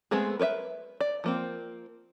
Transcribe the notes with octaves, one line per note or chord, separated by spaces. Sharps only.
G#3 A3 B3 C4 G#4
A#4 B4 C#5 E5
D5
F3 A#3 C4